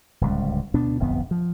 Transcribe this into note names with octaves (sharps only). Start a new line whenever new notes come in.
D1 C#2 G3
D2 B2 B3 D4
D1 G1 F2 B3
F3